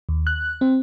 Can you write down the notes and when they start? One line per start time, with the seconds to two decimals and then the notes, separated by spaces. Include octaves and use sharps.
0.09 D#2
0.27 F#6
0.61 C4